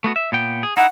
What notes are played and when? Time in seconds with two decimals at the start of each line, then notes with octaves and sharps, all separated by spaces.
0.04 A3 B3 F#4
0.16 E5
0.32 A#2 B3 G5
0.63 G#4
0.77 D#4 E4 F#5